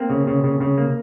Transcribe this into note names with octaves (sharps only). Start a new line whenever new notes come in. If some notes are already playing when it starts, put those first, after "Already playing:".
Already playing: A#3 C4
C#3
C#3
C#3
C#3
A#3